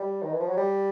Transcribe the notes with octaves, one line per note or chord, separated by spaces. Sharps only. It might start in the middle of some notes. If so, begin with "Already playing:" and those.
Already playing: G3
D#3
E3
F3
F#3
G3